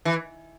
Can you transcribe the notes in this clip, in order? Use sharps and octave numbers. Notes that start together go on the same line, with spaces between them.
E3